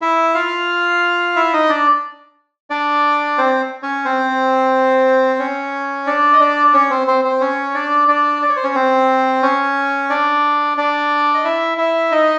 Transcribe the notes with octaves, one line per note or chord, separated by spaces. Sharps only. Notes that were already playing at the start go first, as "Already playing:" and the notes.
E4 E5
F4 F5
E4 E5
D#4 D#5
D4 D5
D4 D5
C4 C5
C#4 C#5
C4 C5
C#4 C#5
D4 D5
D#5
D4 D5
D5
C#4 C#5
C4 C5
C4 C5
C4 C5
C#4 C#5
D4 D5
D4 D5
D5
C#5
C5
C#4 C#5
C4 C5
C#4 C#5
D4 D5
D4 D5
D#5
E4 E5
E4 E5
D#4 D#5